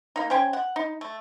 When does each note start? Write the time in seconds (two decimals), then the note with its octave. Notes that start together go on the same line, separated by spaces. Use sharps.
0.16 A#3 D#4
0.30 C#4 C5 G5 G#5
0.53 F#5
0.76 D#4
1.01 A3